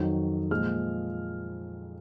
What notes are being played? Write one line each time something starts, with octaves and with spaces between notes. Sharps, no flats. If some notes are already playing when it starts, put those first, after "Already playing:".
Already playing: F2 D#3 F#3
A#2 F3 G#3 F6